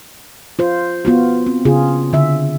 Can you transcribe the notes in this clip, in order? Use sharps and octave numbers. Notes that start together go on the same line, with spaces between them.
F4 C5
B3 F4 F#4
C4
C#3 F4 G#4
D3 E5